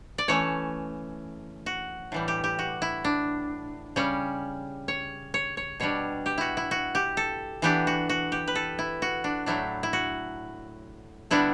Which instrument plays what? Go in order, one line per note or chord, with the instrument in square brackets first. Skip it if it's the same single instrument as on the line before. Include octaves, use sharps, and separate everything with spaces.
[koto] D5
E3 A3 C#4 C#5
F#4
A2 E3 G3
G4
G4
F#4
E4
D4
C#3 G3 C#4
C#5
C#5
C#5
B2 G3 D4 C#5
G4
E4 F#4
E4
F#4
G4
A4
E3 B3 D4 G4
F#4
F#4
G4
B4
A4
E4
F#4
D4
A2 F#3 A3 D4 E4
E4
F#4
D3 G3 B3 D4 E4